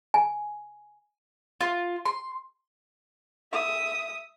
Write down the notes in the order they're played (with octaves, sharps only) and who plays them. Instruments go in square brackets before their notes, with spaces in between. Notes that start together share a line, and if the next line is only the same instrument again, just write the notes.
[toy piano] G#5
[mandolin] F4
C6
[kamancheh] E5 D#6